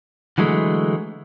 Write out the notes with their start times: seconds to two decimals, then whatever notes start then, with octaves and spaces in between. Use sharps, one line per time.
0.38 D3 E3 F#3 G#3 A3